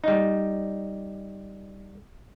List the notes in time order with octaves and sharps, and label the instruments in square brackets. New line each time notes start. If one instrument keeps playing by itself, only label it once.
[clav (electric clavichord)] G3 D#4